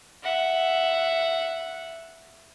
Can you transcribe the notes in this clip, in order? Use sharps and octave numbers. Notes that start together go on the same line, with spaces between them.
E5 F#5